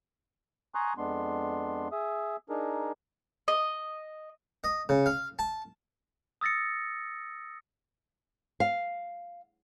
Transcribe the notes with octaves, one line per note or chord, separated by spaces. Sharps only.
G#5 A#5 C6 C#6 D#6 F#6
F2 G#3 B3 D4 C6
G#4 E5 D#6
D4 D#4 G#4 A#4
D#5
D#5
C#3
F5
A5
D#6 E6 A6 A#6 C#7
F5